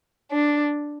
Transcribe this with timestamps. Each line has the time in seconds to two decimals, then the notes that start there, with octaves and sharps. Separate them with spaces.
0.32 D4